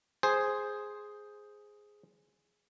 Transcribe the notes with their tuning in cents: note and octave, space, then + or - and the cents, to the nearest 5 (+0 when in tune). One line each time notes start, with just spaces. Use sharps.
G#4 +0 C5 +0